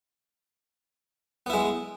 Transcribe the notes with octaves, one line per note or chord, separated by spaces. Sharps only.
G#3 B3 E4